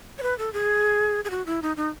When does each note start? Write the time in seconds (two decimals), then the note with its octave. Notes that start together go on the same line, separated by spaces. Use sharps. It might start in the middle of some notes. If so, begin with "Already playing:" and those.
0.18 C#5
0.23 B4
0.39 A4
0.53 G#4
1.25 G#4
1.30 F#4
1.46 E4
1.62 D#4
1.77 D#4